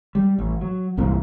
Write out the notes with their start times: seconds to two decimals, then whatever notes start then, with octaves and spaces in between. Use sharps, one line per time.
0.15 G3
0.38 A1
0.61 F#3
0.97 C2 G2 A#2 E3